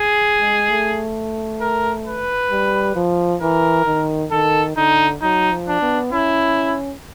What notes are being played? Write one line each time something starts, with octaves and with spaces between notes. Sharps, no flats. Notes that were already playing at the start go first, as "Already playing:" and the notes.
Already playing: G#4
G#3
A3
A#4
B4
G3
F3
E3 A#4
D#3
D#3 A4
D3 D#4
F#3 D#4
F3
D4
B3
C#4 E4